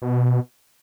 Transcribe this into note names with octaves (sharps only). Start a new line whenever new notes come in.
B2